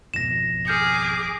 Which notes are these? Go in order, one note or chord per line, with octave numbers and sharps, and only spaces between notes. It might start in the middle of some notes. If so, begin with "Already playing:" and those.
G#1 F2 B2 A#6 E7
G#4 D6 F6 G6 C#7